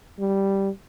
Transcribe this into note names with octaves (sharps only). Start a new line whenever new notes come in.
G3